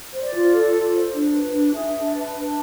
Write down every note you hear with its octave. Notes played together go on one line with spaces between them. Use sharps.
C5
D5
F4
A4
F4
C5
D4
B4
D4
G#4 E5
D4
B4
D4